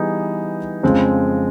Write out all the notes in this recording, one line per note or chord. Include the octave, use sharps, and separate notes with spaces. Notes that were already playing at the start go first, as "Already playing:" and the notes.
Already playing: E3 G3 B3 D#4 G#4
F2 C#3 F3 G#3 C4